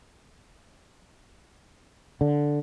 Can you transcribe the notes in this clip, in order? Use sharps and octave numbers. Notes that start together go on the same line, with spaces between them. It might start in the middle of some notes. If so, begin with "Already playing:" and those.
D3